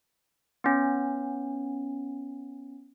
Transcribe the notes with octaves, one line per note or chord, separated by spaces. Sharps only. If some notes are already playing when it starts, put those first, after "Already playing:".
B3 C#4